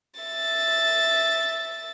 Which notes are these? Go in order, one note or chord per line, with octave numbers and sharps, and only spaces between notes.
E5 A6